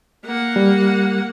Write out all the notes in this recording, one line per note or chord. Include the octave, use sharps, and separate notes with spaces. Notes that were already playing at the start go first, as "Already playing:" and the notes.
A#3 F#5
G3